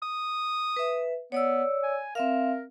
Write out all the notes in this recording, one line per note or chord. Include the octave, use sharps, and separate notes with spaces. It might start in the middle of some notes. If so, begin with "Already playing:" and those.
D#6
B4 E5
B3 C#5 D5 E6
G#5
C4 A#4 E5 F5